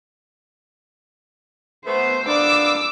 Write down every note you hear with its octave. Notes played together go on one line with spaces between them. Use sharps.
A3 B3 C5
A#3 B3 D4 D6 E6